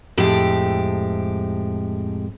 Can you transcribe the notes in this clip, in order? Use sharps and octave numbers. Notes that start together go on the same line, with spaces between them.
F2 A2 G#3 G4